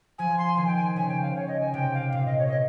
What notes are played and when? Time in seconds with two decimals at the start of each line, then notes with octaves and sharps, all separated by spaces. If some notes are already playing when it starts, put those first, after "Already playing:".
0.18 F3 G#5
0.38 C6
0.57 D#3 G#5
0.67 G5
0.76 G#5
0.96 C#3 G#5
1.09 G5
1.22 F5
1.31 C5
1.36 C#5
1.48 D#5
1.60 G#5
1.74 C3 G5
1.94 F5
2.13 A#2 F5
2.26 D#5
2.38 C#5
2.48 D#5